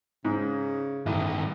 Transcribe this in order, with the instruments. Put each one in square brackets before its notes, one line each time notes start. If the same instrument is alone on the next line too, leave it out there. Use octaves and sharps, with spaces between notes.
[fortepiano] G#2 [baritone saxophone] C#3
[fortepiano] A1 [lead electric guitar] G2 D#3